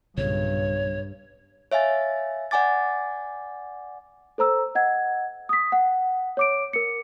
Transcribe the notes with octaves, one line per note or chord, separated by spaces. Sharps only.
B1 G2 A#2 C#3 C#5
C#5 E5 F5 G#5 A6
D5 F#5 G#5 D6 A6
A4 C5 A#5 E6
D#5 F#5 G#6
D#6 B6
F#5
C#5 D6 D7
A#4 C#7